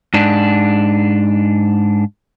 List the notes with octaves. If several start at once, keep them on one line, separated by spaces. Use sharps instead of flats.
G#2 D4